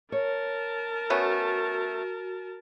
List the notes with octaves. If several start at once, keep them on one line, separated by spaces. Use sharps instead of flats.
A#4 C#5 A5
A3 B3 C#4 F#4